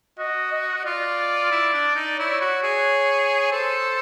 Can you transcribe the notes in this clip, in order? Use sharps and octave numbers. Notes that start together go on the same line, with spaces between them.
F#4 D#5
D#5
F4 D5
E4
D4
D#4
E4 C#5
F#4
G#4
A4 C5